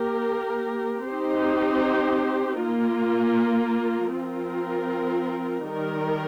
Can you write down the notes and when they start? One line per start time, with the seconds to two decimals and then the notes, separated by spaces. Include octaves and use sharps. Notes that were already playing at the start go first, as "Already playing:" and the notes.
Already playing: A#3 G4 A#4
1.08 C4 D#4 G4 C5
2.62 A#3 F4 A#4
4.16 F3 C4 F4 A#4
5.70 D#3 G3 D#4 A#4